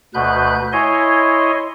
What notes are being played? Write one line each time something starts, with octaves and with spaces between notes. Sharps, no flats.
D2 B2 B4 F#6 G6
E4 C#5 D#5 G#5 C6